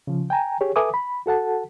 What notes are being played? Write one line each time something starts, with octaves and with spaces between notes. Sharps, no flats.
C#3 F3
G5 G#5 A#5
G4 G#4 C#5
A4 B4 E5 G#5 D6 D#6
B5
F#4 A4 F#5 A5